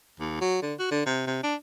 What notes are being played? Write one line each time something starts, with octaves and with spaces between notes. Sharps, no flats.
D#2
F#3
D3
F#4
D3
C3
C3
D4